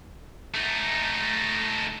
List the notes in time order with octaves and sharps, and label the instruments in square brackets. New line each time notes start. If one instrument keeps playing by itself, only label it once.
[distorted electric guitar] A3 D#4